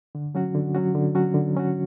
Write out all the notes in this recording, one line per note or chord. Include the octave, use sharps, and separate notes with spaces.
D3
F#3 C#4 F#4
D3
F#3 C#4 F#4
D3
F#3 C#4 F#4
D3
F#3 C#4 F#4